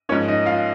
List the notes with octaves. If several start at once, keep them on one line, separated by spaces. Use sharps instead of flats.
G#2 F3 A#3 C#4 D#4 C#5
D#4 D#5
F4 F5